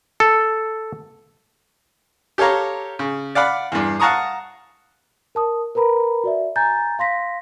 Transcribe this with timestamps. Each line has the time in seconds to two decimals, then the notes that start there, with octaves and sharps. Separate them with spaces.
0.20 A4
2.38 G4 A4 C#5 F5 A#5
2.99 C#3
3.35 D5 F5 F#5 B5
3.72 E2 G2
4.00 F5 F#5 A5 A#5 C#6 D#6
5.35 A#4 A5 D#6
5.75 A#4 B4 A#5 B5
6.24 F#4 D5 E5
6.56 G#5 A#5 G6 A6
6.99 F5 C6 A#6 B6